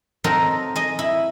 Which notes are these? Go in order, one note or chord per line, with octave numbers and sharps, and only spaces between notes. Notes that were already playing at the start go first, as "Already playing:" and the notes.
F#3 C4 D#4 A4 A#4
G#4 D#5
E4